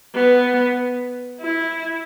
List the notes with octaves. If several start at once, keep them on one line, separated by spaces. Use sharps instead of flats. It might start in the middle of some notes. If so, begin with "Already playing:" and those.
B3
E4